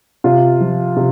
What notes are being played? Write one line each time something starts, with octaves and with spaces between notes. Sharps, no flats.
C3 F4
F3
C3